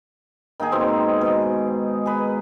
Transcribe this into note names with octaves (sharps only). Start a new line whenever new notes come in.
D#3 A#3 D#4 G#4
G#2 B2 G#3 C4
B2
G#4 B4